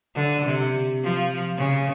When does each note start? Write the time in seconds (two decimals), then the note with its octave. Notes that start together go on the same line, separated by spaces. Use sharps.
0.15 D3
0.45 C3
1.04 F3
1.57 C#3